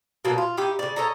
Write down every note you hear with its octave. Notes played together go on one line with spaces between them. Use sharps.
B2 D3 F#3 A#3
F4
D#4 E4 G4
C#3 D5
A4 C#5 D#5 A#5